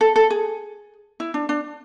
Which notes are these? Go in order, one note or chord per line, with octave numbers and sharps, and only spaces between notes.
A4
A4
G#4
E4
D4
D4